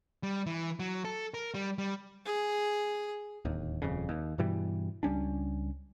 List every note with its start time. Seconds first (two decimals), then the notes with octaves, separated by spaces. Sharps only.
0.23 G3
0.46 E3
0.79 F#3
1.05 A4
1.34 A#4
1.54 G3
1.78 G3
2.26 G#4
3.45 D1 D#2
3.82 D#1 F2 C#3
4.09 D#2
4.38 G2 B2 E3 G3
5.03 C#2 G3 C#4 D4